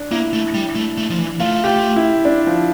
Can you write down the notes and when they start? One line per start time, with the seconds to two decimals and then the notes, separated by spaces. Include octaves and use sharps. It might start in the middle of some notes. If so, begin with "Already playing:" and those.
Already playing: D4
0.11 A#3 E4
0.33 A3
0.54 G3
0.75 A3
0.98 A3
1.10 F3
1.18 E3
1.40 A3 F4
1.64 G4
1.68 F4
1.96 E4
2.25 D4
2.47 F3